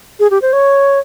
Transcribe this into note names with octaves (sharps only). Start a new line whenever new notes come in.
G#4
G4
C5
C#5